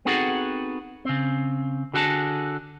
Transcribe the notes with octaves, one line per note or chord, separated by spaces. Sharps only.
B3 C4 D#4 F#4 G#4 A4
C#3 C4
D3 F#4 G#4 A4 G5 A5